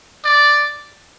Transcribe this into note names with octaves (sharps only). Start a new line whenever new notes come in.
D5